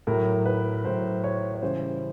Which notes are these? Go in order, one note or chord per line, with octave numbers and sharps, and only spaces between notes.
A2 F#3 A#4
B4
A2 F#3 C5
C#5
C#5
C#3 E3 G3 C5